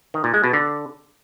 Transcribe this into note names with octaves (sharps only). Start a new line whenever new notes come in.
D#3
A#2
G#3
B2
D3